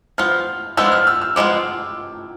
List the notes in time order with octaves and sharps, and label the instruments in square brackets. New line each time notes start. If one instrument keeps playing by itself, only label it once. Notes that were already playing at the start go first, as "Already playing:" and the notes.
[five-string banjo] F3 B3 F4 [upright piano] F6
[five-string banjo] F3 G#3 B3 D4 F4 [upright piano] E6
[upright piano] F6
E6
E6
[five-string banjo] F3 G#3 B3 D4 F4 [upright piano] D6